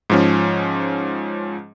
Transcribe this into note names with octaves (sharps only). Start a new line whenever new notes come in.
G#2 F3 C#4